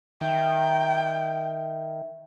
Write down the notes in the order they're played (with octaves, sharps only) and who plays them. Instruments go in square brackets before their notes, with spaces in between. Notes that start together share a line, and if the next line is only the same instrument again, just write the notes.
[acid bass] D#3 [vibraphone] E5 [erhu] G5